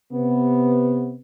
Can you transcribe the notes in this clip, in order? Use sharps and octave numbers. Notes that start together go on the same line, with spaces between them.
C3 B3